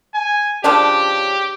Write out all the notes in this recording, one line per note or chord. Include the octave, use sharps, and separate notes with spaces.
G#5
C#3 F3 D4 G4